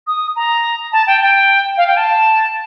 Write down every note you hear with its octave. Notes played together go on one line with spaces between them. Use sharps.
D#6
A#5
A5
G5
G5
F5
G5
A5